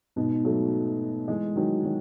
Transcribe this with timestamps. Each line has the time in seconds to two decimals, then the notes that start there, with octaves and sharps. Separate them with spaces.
0.16 G#2 B2
0.45 F#3 A3
1.28 E3 G#3
1.56 D#3 F#3
1.84 D#3 F#3